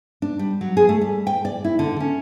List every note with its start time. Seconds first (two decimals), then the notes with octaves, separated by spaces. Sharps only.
0.22 D4
0.39 G3
0.61 F#3
0.77 G#4
0.89 A3
1.01 G3
1.27 G5
1.45 D5
1.64 E4
1.79 D3
2.00 C#4